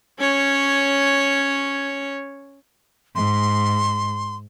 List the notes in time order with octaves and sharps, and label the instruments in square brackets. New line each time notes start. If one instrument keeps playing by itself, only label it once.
[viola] C#4 C#5
[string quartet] G#2 [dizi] C6